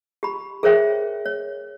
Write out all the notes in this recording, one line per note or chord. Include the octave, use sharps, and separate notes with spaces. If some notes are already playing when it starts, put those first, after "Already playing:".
G4 B5
G#4 A#4 C5 C#5 E5 G5
C#5